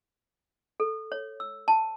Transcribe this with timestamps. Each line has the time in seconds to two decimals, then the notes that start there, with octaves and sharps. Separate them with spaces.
0.80 A4
1.12 C#5
1.40 E6
1.68 A5